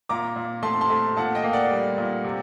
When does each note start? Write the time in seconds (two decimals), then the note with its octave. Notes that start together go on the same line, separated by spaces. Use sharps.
0.09 A#2 A#5 D6
0.36 A#2
0.63 A3 A5 C6
0.81 A5 C6
0.90 A3
1.17 A#2 F#5 A5
1.35 D#5 G5
1.44 A#3
1.53 D5 F#5
1.71 G3
1.98 A#2
2.24 C3